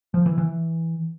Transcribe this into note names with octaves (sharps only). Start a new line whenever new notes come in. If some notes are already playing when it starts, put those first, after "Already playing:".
F3
E3
E3